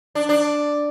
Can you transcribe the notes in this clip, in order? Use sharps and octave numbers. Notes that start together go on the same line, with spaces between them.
D4
D4